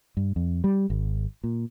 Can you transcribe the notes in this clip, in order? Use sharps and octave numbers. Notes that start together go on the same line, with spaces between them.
G2
F2
G3
G#1
A#2